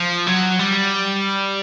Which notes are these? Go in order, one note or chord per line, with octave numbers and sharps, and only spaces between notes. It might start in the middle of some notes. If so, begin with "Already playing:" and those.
Already playing: F3
F#3
G3